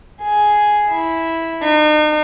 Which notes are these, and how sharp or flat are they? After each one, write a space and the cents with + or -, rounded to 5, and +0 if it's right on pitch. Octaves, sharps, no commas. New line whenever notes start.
G#4 +5
E4 -5
D#4 -40